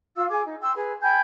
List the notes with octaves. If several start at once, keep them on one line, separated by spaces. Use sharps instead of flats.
F4 F5 E6
G#4 G#5 D6
D#4
G5 C6 E6
G#4 B4
G5 G#5 B5 G6